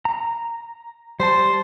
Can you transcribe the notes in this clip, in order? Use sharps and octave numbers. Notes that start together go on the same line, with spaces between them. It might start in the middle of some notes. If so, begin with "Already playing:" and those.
A#5
G3 C5 A5